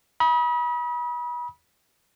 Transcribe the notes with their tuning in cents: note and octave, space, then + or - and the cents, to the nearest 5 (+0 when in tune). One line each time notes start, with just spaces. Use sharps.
B5 -35 D#6 +30